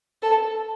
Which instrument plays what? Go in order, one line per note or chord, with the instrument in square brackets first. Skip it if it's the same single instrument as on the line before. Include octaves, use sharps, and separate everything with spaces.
[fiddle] A4